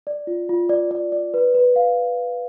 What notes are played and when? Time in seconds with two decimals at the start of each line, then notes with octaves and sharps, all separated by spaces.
0.07 D5
0.27 F4
0.49 F4
0.69 D5
0.91 D5
1.12 D5
1.34 B4
1.55 B4
1.76 F5